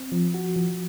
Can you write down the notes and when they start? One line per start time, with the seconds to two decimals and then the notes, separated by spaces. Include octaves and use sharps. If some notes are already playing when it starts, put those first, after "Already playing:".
Already playing: C4
0.12 F3
0.34 F#4
0.56 F3